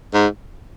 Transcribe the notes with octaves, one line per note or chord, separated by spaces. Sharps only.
G#2